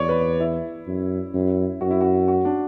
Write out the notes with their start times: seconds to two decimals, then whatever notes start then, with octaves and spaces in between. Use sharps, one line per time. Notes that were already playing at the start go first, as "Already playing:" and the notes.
Already playing: E2 C#5 D5
0.09 B4
0.40 E4
0.87 F#2
1.34 F#2
1.81 F#2 F#4
1.90 E4
2.01 F#4
2.28 F#4
2.45 D4